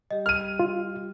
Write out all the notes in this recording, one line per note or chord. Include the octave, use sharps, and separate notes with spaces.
G3 G4 D#5
F6 D#7
F4